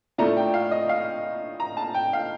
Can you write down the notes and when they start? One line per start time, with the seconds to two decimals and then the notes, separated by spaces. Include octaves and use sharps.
0.18 A2 A3 D4 F4 A#5
0.37 G5
0.54 F5
0.71 D#5
0.89 F5
1.60 A#5
1.77 A5
1.94 G5
2.13 F5